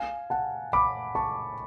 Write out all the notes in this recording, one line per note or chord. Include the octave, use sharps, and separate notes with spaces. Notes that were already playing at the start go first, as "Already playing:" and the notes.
Already playing: F5 G#5
F#5 A5
B5 D6
A5 C#6